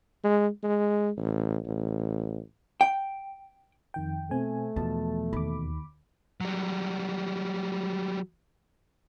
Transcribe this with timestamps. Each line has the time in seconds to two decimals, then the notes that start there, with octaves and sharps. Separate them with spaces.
0.24 G#3
0.63 G#3
1.17 A1
1.65 A1
2.81 G5
3.94 F2 D#3 G5
4.31 B2 A3 C4 G#5
4.76 E2 B2 F3 A5
5.33 D#2 B5 D6
6.41 F#3 G3